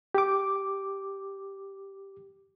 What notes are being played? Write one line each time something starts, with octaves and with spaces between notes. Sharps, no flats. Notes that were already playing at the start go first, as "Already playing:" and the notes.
G4 D6